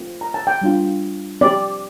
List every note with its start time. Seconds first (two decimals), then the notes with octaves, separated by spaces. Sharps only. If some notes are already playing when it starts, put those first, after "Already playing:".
Already playing: A3 C4 F4
0.21 A#5
0.34 A5
0.47 G5
0.61 G3 D4 F4
1.41 C4 G4 D5